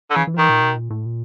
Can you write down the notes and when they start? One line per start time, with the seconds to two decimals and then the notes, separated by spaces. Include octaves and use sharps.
0.10 D3
0.16 C#3 E3
0.27 E3
0.34 F3
0.38 D#3 E3
0.49 A#2
0.61 B2
0.75 A#2
0.90 A2
1.06 A#2